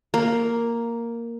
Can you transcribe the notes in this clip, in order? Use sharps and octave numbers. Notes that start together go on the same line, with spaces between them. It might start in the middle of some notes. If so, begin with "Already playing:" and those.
A#3